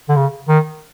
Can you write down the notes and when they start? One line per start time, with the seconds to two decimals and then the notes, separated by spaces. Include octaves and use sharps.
0.09 D3
0.16 C#3
0.49 D#3